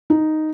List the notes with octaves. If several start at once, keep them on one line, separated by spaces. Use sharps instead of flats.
D#4